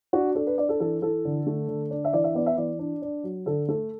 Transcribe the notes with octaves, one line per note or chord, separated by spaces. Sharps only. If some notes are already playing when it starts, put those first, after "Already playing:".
D4 F#4
D4 A4
B4
D4 D5
A4
E3 A4
E3 A4
D3
A3
D3
D4
E5
E3 D5
E5
B3 D5
E5
E3 D5
D4
D4
F#3
D3 A4
A3 A4